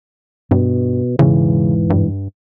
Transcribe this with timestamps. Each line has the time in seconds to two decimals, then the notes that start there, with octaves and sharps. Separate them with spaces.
0.51 G2 B2
1.19 E1 G#2 C#3 E3
1.90 G2